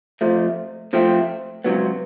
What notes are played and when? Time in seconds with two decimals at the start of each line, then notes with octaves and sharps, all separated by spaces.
0.21 F2 C3 F3 A3
0.93 C3 F3 A3 C4
1.64 C#2 C3 D#3 F#3 B3